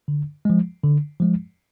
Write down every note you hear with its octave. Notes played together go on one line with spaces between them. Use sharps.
D3
F3 G#3
D3
F3 G#3